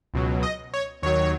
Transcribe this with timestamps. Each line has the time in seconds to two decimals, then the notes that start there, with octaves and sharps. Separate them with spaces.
0.14 C#2 B2 F#3
0.43 D#5
0.74 C#5
1.02 D#2 D#3 F#3 C#5